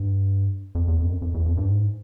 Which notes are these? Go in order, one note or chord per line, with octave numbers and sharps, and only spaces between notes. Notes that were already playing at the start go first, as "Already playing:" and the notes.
Already playing: G2
F2
E2
F2
F#2
F2
F2
E2
F2
G2
G#2